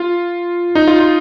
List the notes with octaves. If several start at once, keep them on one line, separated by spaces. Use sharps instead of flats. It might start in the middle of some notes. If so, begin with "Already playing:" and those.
Already playing: F4
D#4
F4
F4